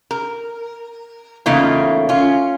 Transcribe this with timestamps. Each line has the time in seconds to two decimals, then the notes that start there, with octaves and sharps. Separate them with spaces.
0.11 A#4
1.46 E2 C#3 A3 A#3 D#4 F4
2.09 C#4 F4